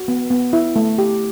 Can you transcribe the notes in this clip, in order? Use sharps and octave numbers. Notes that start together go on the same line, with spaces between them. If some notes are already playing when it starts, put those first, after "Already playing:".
Already playing: F#4
B3
B3
E4
A3
G4